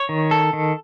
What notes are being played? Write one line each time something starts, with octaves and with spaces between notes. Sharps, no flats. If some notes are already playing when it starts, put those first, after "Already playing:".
Already playing: C#5
D#3
A4
D#3